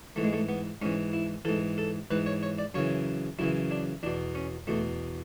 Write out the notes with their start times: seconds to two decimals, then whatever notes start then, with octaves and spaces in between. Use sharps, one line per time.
0.16 G#2 E3 A3
0.24 G#3
0.33 A3
0.49 B3
0.82 G#2 E3 C#4
1.13 E4
1.45 G#2 E3 A4
1.78 A4
2.11 G#2 E3 B4
2.26 C#5
2.43 C#5
2.59 D5
2.74 F#2 C#3 E3 C#5
3.39 F#2 C#3 E3 E4
3.71 D4
4.03 E2 B2 D4
4.35 C#4
4.67 E2 B2 A3